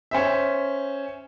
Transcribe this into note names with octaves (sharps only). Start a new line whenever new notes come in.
C#4 C5 E5